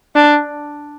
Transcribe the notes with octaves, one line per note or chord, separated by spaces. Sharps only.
D4